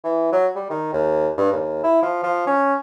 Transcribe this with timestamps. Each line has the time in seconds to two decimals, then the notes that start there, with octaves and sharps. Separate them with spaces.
0.04 E3
0.32 F#3
0.56 G3
0.70 D#3
0.93 D#2
1.37 G2
1.52 D#2
1.84 E4
2.02 F3
2.23 F3
2.47 C#4